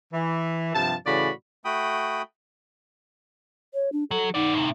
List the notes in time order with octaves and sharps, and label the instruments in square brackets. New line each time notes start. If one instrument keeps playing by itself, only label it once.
[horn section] E3
G2 C3 F3 A5
A2 C#3 E3 F#4 D5 B5
[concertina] A3 F#4 G5 B5 D#6
[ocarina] C#5
D4
[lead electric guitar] F#3 [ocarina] A4
[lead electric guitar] B3 D5 [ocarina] D#4
[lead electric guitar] A2 C3